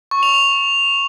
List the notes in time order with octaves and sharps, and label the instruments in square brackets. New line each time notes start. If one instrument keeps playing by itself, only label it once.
[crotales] C#6
F7
F7